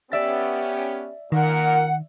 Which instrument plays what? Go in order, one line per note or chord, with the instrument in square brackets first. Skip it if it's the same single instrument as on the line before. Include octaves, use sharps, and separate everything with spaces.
[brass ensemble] B3 C#4 G4 [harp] D5 E5 A6
[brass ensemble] A#2 A#4 [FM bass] D#3 [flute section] F#5